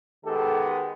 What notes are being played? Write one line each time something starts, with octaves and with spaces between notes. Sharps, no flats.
D#3 G#3 B3 G4 A4